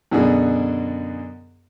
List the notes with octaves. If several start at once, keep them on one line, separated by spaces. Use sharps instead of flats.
F#2 B2 D3 G#4 D5